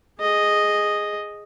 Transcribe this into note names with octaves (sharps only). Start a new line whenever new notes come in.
G#4 D#5